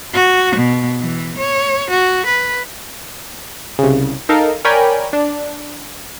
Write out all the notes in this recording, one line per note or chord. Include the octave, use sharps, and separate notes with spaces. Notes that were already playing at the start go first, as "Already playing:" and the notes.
F#4
B2
E3
C#5
F#4
B4
C2 C#3
D#4 A4 A#4 F5
A#4 C#5 D5 G5 G#5 B5
D4